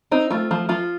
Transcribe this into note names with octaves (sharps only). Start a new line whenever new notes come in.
C4 D#4
A3 F4
F3
F3 F4